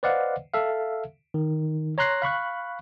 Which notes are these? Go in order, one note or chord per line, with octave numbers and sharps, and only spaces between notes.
B4 C5 D5 D#5 F5 F#5
A4 E5 F5
D#3
C#5 A#5 C6 F#6 A#6 C7
F5 B5 C#6 F#6